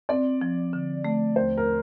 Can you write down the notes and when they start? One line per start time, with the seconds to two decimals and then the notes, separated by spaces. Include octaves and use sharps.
0.09 C4 D5
0.41 F3
0.73 D3
1.05 A3
1.36 D#2 C5
1.57 A#4